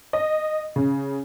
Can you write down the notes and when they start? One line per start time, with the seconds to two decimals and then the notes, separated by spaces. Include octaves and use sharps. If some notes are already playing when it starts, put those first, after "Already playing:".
0.13 D#5
0.76 C#3